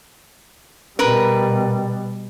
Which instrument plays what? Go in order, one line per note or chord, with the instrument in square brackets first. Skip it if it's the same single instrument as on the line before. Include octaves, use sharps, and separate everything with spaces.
[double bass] B2 G3 [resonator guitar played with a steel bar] A#4 B4